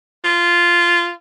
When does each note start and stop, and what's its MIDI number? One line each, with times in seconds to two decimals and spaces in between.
0.24 1.12 65